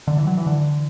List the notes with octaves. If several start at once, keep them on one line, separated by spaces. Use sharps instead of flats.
D3
E3
F#3
E3
D3